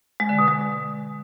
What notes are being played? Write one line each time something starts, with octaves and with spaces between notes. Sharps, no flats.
G#3
D3
B2
G#3